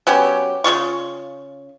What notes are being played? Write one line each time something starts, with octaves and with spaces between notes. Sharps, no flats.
F#3 B3 C#4 G4
C#3 F3 F4 C#6